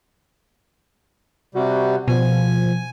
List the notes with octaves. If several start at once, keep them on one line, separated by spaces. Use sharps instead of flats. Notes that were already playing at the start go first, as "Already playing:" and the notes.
C3 G3 F#4
B2 F3 G#5